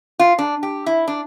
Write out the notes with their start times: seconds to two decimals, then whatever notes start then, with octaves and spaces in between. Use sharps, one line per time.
0.19 F4
0.38 D4
0.63 G4
0.86 E4
1.07 D4